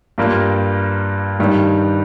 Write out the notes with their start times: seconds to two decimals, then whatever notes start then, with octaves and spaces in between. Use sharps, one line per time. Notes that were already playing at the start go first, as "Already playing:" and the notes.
0.18 G2 G3 A#3 F4
1.39 G2 D#3 G3